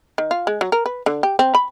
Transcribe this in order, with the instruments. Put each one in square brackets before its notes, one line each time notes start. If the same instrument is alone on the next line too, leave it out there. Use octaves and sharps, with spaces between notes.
[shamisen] D#3
F4
G#3
F#3
A#4
B4
D3
G4
C4
B5